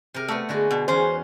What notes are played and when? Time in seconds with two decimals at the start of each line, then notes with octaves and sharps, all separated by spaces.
0.14 C3 A#4
0.28 A3 B3 A#5
0.49 D3 G#3 F#4
0.71 B2
0.88 E2 C#4 C5